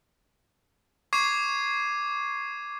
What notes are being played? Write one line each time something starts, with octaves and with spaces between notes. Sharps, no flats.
C#6 D6 G#6 C7 D#7